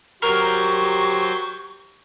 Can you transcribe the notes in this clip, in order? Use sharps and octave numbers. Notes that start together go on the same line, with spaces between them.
F#3 G4 A#4 C5 C#6